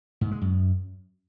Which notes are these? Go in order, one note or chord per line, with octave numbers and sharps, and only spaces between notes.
G#2
G#3
F#2